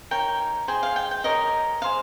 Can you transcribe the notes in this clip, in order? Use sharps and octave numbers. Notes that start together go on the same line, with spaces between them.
D#4 A#4 C#5 G5
G#4 C5 D#5 G5
F5
G5
G5
G4 A#4 C#5 D#5
G#4 C5 D#5 F5